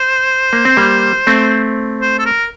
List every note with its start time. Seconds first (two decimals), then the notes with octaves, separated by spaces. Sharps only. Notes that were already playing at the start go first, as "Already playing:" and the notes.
Already playing: C5
0.53 A#3
0.65 C4
0.77 G3 A#3
1.27 A3 C4
2.01 C5
2.19 A4
2.26 A#4